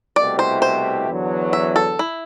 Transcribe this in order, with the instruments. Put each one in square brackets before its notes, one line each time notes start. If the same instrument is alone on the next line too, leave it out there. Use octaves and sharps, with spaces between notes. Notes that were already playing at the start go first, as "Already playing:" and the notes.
[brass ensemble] C2 B2 A3 E4 G4 [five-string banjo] D5
[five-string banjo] C5
C5
[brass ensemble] E2 D3 F#3
[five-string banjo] E5
A4
E4